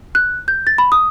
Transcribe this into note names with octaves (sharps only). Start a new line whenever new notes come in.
F#6
G6
A6
B5
D#6